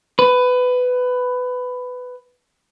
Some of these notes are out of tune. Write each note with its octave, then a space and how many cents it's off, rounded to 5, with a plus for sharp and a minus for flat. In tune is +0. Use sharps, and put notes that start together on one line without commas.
B4 +15